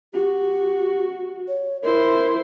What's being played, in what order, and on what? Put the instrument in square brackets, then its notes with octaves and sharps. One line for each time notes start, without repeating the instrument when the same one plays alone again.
[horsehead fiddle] F#4 [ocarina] G4
[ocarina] C#5
[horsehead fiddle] E4 C5 [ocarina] A#4